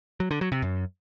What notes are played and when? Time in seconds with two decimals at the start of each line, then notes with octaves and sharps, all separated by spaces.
0.20 F#3
0.31 D3
0.41 F#3
0.52 C3
0.62 F#2